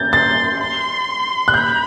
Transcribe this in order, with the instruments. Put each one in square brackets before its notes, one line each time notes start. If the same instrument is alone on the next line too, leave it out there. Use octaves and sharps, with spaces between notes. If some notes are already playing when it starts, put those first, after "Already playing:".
Already playing: [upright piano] G6 A6
[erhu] C6 [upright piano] A6
[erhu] C6
[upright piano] F#6
[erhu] B5 [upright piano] G6